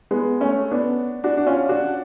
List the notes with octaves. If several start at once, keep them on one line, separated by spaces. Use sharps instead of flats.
G#3 B3
A3 C#4
B3 D4
D4 F#4
D4
C#4 F4
D4 F#4